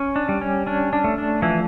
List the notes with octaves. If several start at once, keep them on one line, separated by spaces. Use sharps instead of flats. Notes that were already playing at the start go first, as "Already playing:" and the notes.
Already playing: C#4
D4
G3
C#4
C#4 D4
D4
A3
D4
E3 F3 E4